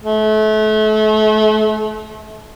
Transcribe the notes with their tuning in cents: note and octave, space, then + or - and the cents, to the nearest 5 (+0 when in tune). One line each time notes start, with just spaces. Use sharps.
A3 -35